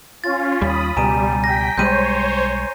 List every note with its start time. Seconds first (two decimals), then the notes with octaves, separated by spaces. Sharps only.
0.24 C#4 F4 A6
0.61 D#2 G3 B5 D#6
0.97 C#2 B2 G3 G#5 A#5 D#7
1.44 G5 A#6 B6
1.78 B1 G3 G#3 C5 C#5 G6 D#7